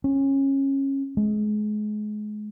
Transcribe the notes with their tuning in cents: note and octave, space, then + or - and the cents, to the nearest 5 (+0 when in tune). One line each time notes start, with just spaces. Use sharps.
C#4 -20
G#3 +30